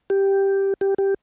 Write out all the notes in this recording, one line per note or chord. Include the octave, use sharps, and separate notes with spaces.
G4
G4
G4